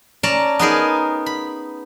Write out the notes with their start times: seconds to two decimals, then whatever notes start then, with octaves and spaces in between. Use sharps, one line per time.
0.23 C#4 D5 A5 A#5
0.59 B3 D#4 G#4 A#4
1.26 B5